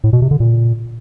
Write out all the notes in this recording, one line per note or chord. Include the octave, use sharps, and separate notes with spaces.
A2
B2
C3
D3
A#2